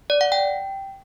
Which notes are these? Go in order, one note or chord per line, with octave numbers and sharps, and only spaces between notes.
D5
F#5
G5